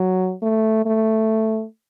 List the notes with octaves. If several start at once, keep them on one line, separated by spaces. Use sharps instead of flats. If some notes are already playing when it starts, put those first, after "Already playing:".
Already playing: F#3
A3
A3